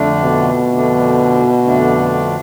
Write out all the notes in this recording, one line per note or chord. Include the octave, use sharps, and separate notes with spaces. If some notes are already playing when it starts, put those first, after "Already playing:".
Already playing: F2 D3 A3 D4
B2
F2 D3 A3 D4
F2 D3 A3 D4